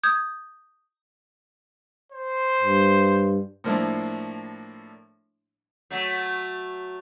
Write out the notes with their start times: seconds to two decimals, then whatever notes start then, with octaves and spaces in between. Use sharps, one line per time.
0.03 D#6 G6 G#6
2.12 C5
2.61 G2
3.64 A2 F3 A#3 D4 E4
5.91 F#3 A3